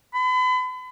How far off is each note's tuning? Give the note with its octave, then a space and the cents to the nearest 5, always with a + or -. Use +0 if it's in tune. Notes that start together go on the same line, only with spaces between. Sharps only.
B5 +40